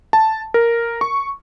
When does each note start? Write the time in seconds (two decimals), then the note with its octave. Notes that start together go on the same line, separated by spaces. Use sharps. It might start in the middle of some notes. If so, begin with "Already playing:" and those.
0.13 A5
0.54 A#4
1.01 C#6